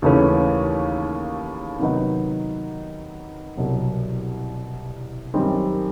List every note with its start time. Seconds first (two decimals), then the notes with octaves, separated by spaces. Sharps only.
0.02 D#2 C#3 E3 A3 C#4
1.79 C3 D#3 F#3 B3 D#4
3.57 C2 B2 F#3
5.34 F#2 D#3 G3 C4 D#4